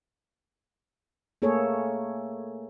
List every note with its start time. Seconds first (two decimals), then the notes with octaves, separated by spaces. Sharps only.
1.42 A3 A#3 G#4 A4 C#5